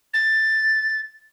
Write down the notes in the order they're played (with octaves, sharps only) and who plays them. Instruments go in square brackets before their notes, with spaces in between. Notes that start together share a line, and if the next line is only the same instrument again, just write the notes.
[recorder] A6